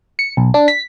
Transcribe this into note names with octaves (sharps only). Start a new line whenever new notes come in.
C#7
B1
D4
B6